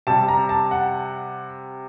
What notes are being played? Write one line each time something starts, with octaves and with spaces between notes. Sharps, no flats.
C3 G3 A5
A#5
A5
F#5